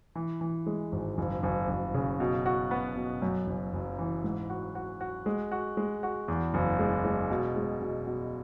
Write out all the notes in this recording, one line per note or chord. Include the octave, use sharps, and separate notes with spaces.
E3
E3
G#3
G#1
F#1
F#1
F#1
C#3
B2
F#4
B3
B2
F#2
F#1
F#1
E3
G#2
F#4
F#4
F#4
G#3
F#4
G#3
F#4
E2
F#1
G#3
G#3
B2
G#3
B2
B2